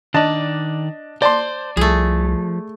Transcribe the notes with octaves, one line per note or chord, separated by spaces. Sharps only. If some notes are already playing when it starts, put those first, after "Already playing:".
D#3 D4 D5 D#5 A5
C5 D5 A5 C6
C2 F3 A3 G#4